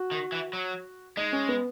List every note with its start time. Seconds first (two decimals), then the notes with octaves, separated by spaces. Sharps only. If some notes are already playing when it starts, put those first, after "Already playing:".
Already playing: F#4
0.12 D#3
0.32 E3
0.53 F#3
1.17 G#3 D#4
1.33 C#4
1.49 B3